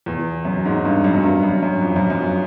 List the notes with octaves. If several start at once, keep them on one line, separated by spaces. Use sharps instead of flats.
E2
F#2
G#2
G2
F#2
F#2
G2
F#2
F#2
F2
F#2
F#2